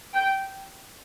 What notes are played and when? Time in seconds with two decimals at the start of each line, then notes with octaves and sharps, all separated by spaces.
0.14 G5